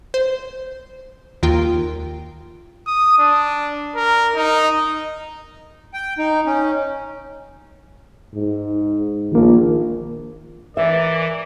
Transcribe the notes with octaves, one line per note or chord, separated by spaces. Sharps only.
C5
D#2 D#3 F4 A#4 G5
D#6
D4
A#4
D#4
G5
D#4
C#4
G#2
A#1 D#3 A#3
E3 A#4 D5 E5